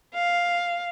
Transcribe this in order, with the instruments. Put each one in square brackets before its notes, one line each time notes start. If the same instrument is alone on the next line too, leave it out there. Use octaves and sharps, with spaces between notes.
[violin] F5